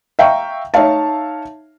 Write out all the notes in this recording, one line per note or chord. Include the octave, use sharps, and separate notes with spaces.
E5 F5 G5 A#5 C#6
D#4 C#5 E5 F5 A5